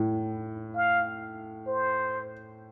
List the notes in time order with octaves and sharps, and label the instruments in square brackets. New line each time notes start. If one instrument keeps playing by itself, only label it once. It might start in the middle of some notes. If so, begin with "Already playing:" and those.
Already playing: [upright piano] A2
[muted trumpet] F5
C5